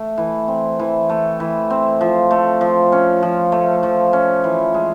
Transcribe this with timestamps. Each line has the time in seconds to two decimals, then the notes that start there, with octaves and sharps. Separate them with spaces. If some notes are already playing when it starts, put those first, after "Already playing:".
Already playing: A3
0.18 E3
0.48 C4
0.79 E3
1.10 A3
1.40 E3
1.70 C4
2.01 F3
2.31 A3
2.61 F3
2.92 C#4
3.23 F3
3.52 A3
3.83 F3
4.13 C#4
4.44 E3
4.74 G#3